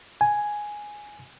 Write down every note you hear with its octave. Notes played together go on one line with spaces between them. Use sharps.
G#5